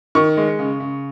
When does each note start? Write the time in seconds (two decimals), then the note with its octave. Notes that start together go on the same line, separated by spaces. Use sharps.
0.15 D#3 C#6
0.37 G#3
0.59 C#3
0.80 C#3